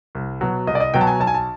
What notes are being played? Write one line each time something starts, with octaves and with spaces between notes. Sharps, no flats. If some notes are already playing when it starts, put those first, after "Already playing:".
C2
B2 F#3
C2 D#5
D5
D#5
B2 F#3 G5
A5
G#5
B1 A5
G#5
A5